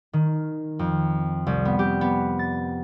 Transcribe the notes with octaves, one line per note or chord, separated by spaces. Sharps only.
D#3
F2
C2
B3
G4
B3
A6